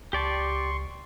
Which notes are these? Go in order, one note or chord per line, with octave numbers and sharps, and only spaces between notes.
C#2 G4 D5 A5 C6 C#6